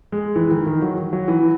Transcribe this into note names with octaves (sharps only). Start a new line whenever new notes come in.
G#3
E3
D#3
D#3
F#3
F#3
E3